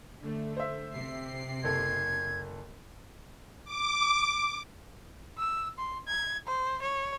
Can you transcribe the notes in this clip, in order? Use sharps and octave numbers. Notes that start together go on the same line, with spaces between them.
D3 A3
C5 E5
C3 C7
F#1 A4 G#6
D6
E6
C6
G#6
C5
C#5